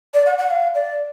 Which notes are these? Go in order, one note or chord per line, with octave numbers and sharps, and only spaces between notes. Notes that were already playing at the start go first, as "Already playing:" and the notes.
D5
F#5
F#5
F5
D5